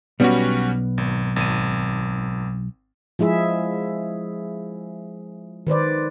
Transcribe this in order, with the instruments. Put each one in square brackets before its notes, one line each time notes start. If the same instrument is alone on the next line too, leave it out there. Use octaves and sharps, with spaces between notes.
[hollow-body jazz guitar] B1 B3 D5 [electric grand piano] G3 C#4 F#4
[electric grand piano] G#1
G#1 D#7
[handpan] F3 G#3 E4 G#4 E5
D#3 B4 C5 D5